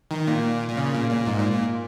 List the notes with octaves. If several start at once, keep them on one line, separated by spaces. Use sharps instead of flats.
D#3
A#2
A#2
C#3
A#2
A#2
G#2
A#2
A#2